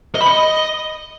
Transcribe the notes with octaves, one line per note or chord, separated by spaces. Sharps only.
D#5
B5
D#5